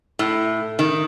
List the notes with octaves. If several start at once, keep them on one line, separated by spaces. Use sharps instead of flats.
A2
D#3